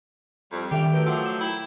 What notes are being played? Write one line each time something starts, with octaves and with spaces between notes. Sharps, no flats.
F2 G3
D#3 G4 A4 E5 F7
F#3 A3 A#4 B4 E5 G6 D7
F3 E5 F#5 D6 E6
E7
E4 G5